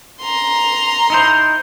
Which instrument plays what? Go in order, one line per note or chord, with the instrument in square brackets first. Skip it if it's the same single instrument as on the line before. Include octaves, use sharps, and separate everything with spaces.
[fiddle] A#5 C6
[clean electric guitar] D#4 E4 C5